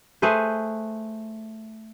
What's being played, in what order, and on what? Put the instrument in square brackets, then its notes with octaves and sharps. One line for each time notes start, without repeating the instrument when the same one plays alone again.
[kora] A3 G#4 B4 C5